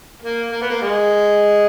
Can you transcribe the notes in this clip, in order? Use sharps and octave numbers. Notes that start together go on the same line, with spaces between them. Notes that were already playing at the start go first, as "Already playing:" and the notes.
A#3
A#3
B3
A#3
G#3